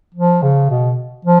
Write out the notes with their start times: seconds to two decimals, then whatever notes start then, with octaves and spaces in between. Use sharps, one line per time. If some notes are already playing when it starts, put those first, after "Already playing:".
0.14 F3
0.42 C#3
0.69 B2
1.25 F3